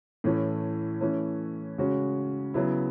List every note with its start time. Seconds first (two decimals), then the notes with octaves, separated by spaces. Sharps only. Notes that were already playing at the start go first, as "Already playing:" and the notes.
0.24 A2 E3 A3 C#4
1.01 E3 A3 C#4
1.78 C#3 G#3 C#4 F#4
2.54 C#3 F#3 B3 E4